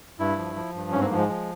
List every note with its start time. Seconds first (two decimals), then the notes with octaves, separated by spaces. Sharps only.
0.19 G2 E4
0.38 F3
0.56 F3
0.75 G2
0.92 G#2 C#4
1.01 C4
1.05 A#3
1.11 F3
1.17 G#3
1.29 F3